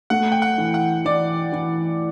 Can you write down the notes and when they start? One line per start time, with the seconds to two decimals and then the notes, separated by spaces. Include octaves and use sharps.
0.10 A3 F#5
0.32 G5
0.42 F#5
0.58 E3
0.74 F#5
1.05 E3 D5
1.52 E3